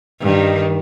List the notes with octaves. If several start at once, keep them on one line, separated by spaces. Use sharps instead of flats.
G2 D#3